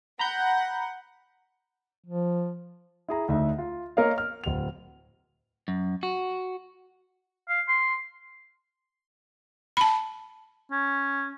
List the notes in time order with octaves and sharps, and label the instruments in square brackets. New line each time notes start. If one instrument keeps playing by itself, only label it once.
[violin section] F#5 [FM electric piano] A#5 B5 G6
[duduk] F3
[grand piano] E4 G#4 A#5
D2 D3 D#4 E5
F4
A#3 A#4 C#5 D#5 F5
F6
D1 F7
[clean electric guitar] F#2
F#4
[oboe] F5
C6
[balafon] A5 B5
[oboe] C#4